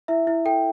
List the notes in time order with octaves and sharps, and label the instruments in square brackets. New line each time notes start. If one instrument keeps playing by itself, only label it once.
[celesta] E4 E5
E4
A4 G5